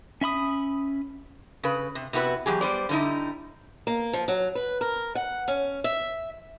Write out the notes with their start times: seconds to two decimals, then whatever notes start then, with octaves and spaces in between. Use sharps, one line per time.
0.21 C#4 E5 B5 D#6
1.63 C#3 B4
1.95 C3
2.13 C3 B3 E4 F#4 B4
2.46 E2 F#3 G4 G#4
2.61 G3 B3 C5 D5
2.89 D3 G3 A#3 D#4 E4
3.87 A#3
4.13 F3
4.28 F#3
4.55 B4
4.81 A#4
5.15 F#5
5.48 C#4
5.84 E5